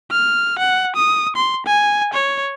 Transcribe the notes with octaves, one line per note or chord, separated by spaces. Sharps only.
F6
F#5
D#6
C6
G#5
C#5